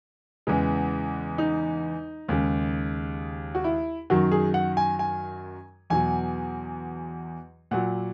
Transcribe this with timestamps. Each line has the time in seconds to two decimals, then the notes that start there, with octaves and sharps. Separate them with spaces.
0.47 E2 C#3 E3 G#3
1.38 D#4
2.28 D#2 C#3 G#3
3.55 F#4
3.64 E4
4.10 F#2 D#3 F#3 F#4
4.32 G#4
4.54 F#5
4.77 G#5
4.99 G#5
5.90 E2 B2 F#3 G#5
7.71 A#2 F#3 F#5